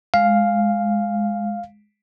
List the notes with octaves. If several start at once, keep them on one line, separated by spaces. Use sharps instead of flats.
G#3 F5